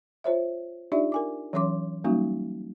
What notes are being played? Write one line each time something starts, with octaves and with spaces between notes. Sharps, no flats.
F4 C5 C#5 E5
D4 D#4 F4 G4 D5 E5
A#4 G#5 D6
E3 F#3 C#4 C#5 C6 D6
F#3 G3 A#3 C#4 D#4 F#4